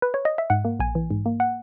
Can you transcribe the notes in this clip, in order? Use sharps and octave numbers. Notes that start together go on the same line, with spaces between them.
B4
C#5
D#5
E5
G#2 F#5
A#3
A#1 G#5
E3
G#2
A#3
F#5